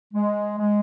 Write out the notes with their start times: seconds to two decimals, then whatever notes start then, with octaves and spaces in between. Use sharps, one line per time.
0.14 G#3
0.58 G#3